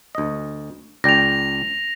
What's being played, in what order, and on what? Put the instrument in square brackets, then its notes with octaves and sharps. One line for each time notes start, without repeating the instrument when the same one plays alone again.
[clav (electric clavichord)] D2 D#5
[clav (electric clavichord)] C#2 D5 G5 [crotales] A#6 F7